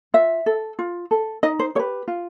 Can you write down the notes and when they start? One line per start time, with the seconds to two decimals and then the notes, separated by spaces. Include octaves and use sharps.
0.14 F4 E5
0.46 A4
0.79 F4
1.11 A4
1.43 D#4 D#5
1.59 C5
1.75 G4 C#5
1.79 B4
2.08 F4